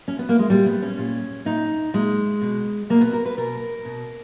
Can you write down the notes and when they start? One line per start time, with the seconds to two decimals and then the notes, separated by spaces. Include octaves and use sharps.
0.08 C#4
0.19 B3
0.29 A#3
0.39 G#3
0.50 A#2 G3
0.66 B3
0.82 C#4
0.98 A#2
1.45 A#2 D#4
1.94 A#2 G#3
2.41 B2
2.90 B2 A#3
3.01 B3
3.13 A#4
3.26 B4
3.37 B2 A#4
3.85 B2